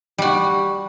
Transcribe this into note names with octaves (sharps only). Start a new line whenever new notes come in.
G3 F#4